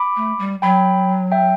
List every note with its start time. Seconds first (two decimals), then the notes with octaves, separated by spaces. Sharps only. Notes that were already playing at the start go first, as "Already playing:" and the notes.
Already playing: B5 D6
0.16 A3
0.39 G3
0.62 F#3 G5 B5
1.32 E5 G5